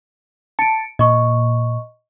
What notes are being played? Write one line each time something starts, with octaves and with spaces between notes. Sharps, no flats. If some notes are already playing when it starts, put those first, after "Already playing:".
A5 C#7 D7
A#2 D#5 C#6